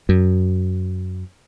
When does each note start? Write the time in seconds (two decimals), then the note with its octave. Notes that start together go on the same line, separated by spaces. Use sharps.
0.09 F#2